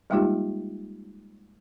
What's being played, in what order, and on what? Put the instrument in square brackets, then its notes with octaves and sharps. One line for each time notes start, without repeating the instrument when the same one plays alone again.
[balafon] G3 G#3 A#3 D#4 F4 G4